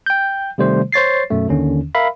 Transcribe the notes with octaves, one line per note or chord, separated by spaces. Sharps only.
G5 G6
C3 D#3 G3 A3 C5
C5 C#5 A6 C7
F#2 B2 A3
D#2 D3 D#3 C#4
A#4 E5 F5 B5